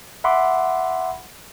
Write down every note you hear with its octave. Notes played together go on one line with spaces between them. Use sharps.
E5 F#5 B5 C6 D6